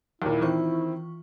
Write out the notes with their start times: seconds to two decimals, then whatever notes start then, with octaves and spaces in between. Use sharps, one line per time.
0.22 D#2 A#2 E4
0.41 D#3 E3 C4 F4 C#6